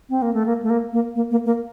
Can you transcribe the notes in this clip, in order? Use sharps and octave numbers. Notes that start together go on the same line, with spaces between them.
C4
A#3
A3
A#3
A3
A#3
A#3
A#3
A#3
A#3